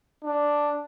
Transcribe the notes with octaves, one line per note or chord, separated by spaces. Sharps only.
D4